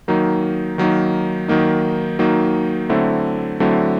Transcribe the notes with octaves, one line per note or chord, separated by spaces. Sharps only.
D#3 F#3 A#3 D#4
D#3 F#3 A#3 D#4
D#3 F#3 A#3 D#4
D#3 F#3 A#3 D#4
D3 F#3 A3 C4 E4
D3 F#3 A3 C4 E4